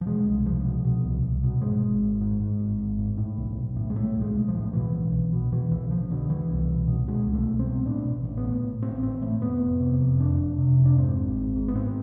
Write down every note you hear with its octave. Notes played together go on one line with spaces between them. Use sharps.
F3
B2 G#3
C2
C2 F3
B2
B2
C2
C2
B2
G#2 G#3
G#1
G#1
G#2
G#2
G#1
G#1
G#2
A2
B1
B1
A2
G#3
A2 A3
B1
G#3
B1
F3
A2
B2 E3
B1
B1
B2
B2 E3
B1 E3
B1 F3
B2 D3
B2 E3
C2
C2
B2
B2 G#3
C2
A3
C2
C4
B2
A2 D4
A1
A1
B3
A2
A2
A1 C4
A1 C4
A2 A3
F1 B3
F1
C3
F2
F1 D4
F1
C3
F2
D4
G#2 C4
G#1
G#1
G#2
B3
G#2 C4